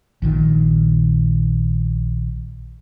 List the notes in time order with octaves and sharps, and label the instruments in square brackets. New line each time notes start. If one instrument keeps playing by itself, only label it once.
[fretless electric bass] A#1 A#2 D#3